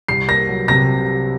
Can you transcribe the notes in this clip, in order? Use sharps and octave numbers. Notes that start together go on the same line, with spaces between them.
C2 C7
A#3 A#6
F#3
C3 A#6